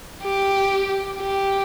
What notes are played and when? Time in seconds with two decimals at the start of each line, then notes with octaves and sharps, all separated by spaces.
0.24 G4
1.20 G4